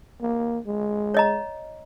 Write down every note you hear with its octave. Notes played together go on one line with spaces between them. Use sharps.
A#3
G#3
C#5 D#5 A#5